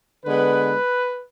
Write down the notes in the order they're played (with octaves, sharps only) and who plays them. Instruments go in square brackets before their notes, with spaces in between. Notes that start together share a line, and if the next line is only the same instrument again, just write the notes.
[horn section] D3 G#3 B3 B4